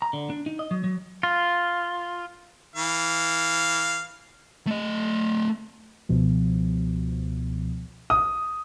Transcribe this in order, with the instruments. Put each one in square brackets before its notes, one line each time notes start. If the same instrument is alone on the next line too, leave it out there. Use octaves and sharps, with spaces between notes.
[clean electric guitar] A#5
D3
D4
D#4
D#5
F#3
F#3
[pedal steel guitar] F4
[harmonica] E3 F5
[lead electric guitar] A3 D#5
[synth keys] C#2 B2 F3
[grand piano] D#6